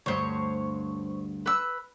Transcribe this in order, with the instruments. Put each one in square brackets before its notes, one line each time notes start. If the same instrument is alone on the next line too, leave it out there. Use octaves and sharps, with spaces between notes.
[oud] D2 G2 [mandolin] C5 C#5
[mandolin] B4 E6